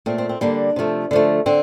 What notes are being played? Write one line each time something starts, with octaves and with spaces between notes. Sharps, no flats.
A#2 A3 C4
C4
C4
D3 G3 A#3 D4
C3 F3 A3
D3 F3 A3
D3 C4